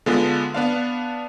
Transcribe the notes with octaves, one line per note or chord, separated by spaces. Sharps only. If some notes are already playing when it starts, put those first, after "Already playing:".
D3 G#3 B3 F4
B3 D4 F5